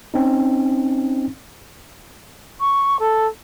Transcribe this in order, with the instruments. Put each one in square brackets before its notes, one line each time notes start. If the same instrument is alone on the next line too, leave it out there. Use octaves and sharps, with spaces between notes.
[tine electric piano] C4 C#4 D#4
[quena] C#6
A4